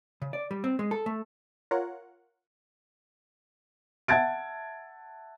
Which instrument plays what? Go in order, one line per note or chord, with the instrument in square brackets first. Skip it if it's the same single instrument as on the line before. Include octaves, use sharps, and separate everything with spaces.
[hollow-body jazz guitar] C#3
D5
G3
C4
G#3
A4
A3
[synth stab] F4 A#4 C#5 F#5
[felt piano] E5 F#5 A5 G#6 A6 D7